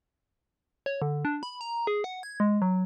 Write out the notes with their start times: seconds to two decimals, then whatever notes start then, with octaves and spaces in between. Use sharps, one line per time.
0.86 C#5
1.02 D3
1.25 D4
1.43 B5
1.61 A#5
1.87 G#4
2.04 F#5
2.23 G#6
2.40 G#3
2.62 F#3